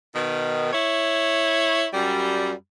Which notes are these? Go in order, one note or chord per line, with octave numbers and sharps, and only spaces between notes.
B2 D#3
E4 C#5
F#2 G3